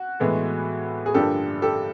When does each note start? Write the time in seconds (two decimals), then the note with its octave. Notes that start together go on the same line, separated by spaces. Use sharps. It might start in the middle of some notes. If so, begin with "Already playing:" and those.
Already playing: F#4
0.20 A2 E3 G#3 B3
1.06 G#4
1.14 G2 D3 F3 A#3 D4 G4 A4
1.62 G4 A4